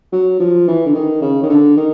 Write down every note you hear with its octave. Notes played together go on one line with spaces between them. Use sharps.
F#3
F3
E3
D3
D#3
C#3
D#3
D3
D#3